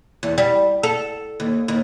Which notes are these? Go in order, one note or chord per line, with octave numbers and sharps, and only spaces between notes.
E2
G3
A4
D#2
D#2